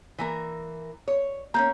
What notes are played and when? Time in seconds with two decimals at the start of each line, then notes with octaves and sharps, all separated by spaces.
0.18 E3 A#3 A#4
1.08 C#5
1.54 A#3 C4 C#4 A#5 G6